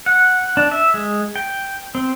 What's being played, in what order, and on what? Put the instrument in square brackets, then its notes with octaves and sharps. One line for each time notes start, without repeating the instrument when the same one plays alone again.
[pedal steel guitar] F#5
D4
E5
G#3
G5
C4